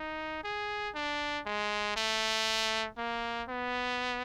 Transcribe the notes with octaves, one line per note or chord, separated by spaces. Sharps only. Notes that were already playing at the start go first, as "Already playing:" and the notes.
Already playing: D#4
G#4
D4
G#3
A3
A#3
B3